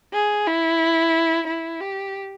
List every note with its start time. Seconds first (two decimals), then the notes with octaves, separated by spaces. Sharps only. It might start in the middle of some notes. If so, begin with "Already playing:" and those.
0.13 G#4
0.47 E4
1.47 E4
1.81 G4